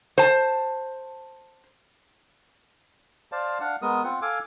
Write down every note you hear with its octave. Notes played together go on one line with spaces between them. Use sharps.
C5 A5
C5 D5 F5 A5
D4 F5 F#5
G#3 B3 A#4 D#6
C4 F4 F#5
A4 F5 G#5 D6